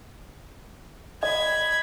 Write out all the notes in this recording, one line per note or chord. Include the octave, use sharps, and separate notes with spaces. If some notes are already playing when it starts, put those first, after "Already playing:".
D#5 B5 G#6